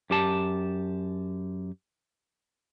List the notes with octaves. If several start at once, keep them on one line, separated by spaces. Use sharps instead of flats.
F#2 G4 A5